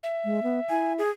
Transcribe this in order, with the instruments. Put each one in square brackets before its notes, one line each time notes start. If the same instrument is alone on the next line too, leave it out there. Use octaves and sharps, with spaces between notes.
[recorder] E5
[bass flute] G#3
B3
[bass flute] E4 [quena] G#5
[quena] G#4